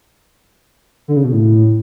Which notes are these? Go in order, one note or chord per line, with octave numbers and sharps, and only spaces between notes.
D3
C#3
B2
A2